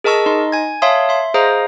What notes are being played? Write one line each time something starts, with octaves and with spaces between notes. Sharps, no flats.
G#4 A#4 D#5 A5 C#6 E6
D#4 D#5 C6
G#5 G#6
C#5 E5 F5 A5 C6 D#6
E5 C6
G#4 C5 D#5 F5 A#5 D#6